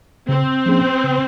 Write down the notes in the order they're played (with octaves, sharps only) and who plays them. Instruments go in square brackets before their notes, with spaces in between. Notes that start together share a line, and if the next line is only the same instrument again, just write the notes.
[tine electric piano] C#3 [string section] C4
[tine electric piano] F3 A#3 C#4 G#4
C#3